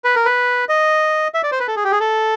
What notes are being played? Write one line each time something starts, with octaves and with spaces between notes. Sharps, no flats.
B4
A#4
B4
D#5
E5
D5
C5
B4
A4
G#4
G4
G#4
A4